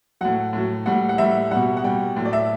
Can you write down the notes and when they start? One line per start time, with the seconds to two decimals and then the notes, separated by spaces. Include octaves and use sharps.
0.21 A2 F#3 F#5
0.53 A2 F#3
0.86 A2 G3 F#5
1.09 F#5
1.18 A2 G3 E5
1.51 B2 G3 F#5
1.77 F#5
1.84 B2 G3 G5
2.17 A2 F#3
2.25 D5
2.33 E5